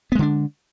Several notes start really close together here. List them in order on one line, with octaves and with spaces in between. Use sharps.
B3 G#3 D3 D4